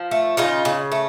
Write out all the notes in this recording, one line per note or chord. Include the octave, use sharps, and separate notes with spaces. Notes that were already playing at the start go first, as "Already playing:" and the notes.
Already playing: F3
A3
C#3 D#4 F4
C#3
A3